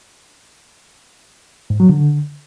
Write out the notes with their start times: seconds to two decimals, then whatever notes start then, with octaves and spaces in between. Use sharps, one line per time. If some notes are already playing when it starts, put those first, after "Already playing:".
1.70 G#2
1.80 F#3
1.89 D3